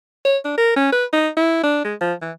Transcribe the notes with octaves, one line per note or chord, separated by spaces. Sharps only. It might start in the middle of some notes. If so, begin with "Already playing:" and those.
C#5
D4
A#4
C#4
B4
D#4
E4
D4
G#3
F3
E3